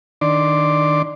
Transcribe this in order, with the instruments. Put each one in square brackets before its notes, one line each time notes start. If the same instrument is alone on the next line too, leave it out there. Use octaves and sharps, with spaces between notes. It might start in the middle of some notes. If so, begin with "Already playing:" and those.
[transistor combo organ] D#3 D4 D5 C6 D6